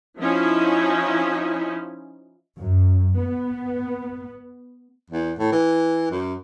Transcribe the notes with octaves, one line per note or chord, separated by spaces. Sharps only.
F3 C#4 D#4 E4
F#2
B3
E2
A2
E3
F#2